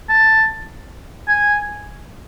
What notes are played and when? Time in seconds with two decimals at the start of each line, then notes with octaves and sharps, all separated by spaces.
0.09 A5
1.28 G#5